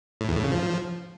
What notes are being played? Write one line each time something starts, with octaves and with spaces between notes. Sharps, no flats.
A2
E2
A2
C#3
F3